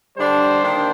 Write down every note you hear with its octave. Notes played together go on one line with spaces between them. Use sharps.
D3 G3 D4 C5
D#3 A#3 D4